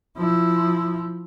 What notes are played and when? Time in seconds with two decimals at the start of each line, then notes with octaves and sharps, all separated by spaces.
0.17 F3 E4